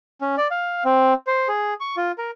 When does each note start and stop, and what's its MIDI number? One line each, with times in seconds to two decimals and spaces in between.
0.21 0.36 61
0.38 0.48 74
0.51 0.84 77
0.85 1.13 60
1.27 1.48 72
1.48 1.74 68
1.81 1.96 85
1.97 2.12 65
2.18 2.31 70